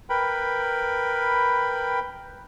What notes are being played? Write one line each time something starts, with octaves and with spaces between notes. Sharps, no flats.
A#4 B4 G5 B5